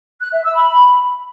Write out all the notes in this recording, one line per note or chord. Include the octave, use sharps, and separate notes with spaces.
F#6
E5
E6
B5